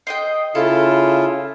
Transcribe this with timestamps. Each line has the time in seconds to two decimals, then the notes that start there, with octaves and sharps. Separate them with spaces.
0.07 C5 D#5 G5
0.55 C#3 E4 F4 A4